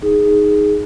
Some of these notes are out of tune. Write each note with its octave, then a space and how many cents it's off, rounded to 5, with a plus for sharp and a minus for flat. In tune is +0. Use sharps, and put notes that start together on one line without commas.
D#4 +0 G#4 +0